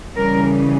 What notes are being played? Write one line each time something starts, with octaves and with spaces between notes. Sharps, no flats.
C#3 E3 G3 C#4 A#4